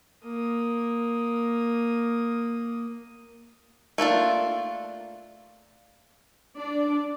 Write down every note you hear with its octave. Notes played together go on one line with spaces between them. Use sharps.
A#3 D#6
A3 A#3 D4 F4
D4 D5